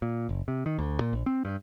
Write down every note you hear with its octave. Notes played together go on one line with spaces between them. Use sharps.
A#2
F#1
C3
D#3
D2
A#2
A#1
C4
G2